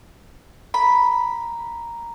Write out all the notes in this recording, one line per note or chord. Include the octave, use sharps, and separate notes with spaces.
A#5 B5